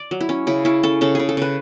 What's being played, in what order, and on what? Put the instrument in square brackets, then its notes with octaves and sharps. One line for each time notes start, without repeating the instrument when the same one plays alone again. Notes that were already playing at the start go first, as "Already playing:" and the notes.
Already playing: [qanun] D5
F#3
E4
C#4
C#3 E4
C#4 E4
C#4 A4
C#3 A4
C#3 G#4
A4
C#3 B4